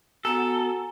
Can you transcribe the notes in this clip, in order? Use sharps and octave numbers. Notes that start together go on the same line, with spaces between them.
B3 F#4 A4 G#5 A#5 E7